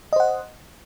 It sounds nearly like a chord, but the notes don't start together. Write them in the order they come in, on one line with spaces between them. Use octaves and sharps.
D#5 C5 F#5